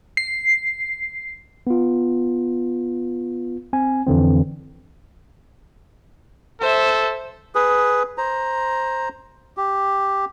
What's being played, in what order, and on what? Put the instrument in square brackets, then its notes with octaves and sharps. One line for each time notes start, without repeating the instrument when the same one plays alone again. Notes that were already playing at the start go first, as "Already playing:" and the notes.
[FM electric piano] C7
[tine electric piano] B3 F4
C4 G#5
F2 D3 E3 C4
[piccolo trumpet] A4 [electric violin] C5 E5
[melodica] G#4 B4
C5 A#5
G4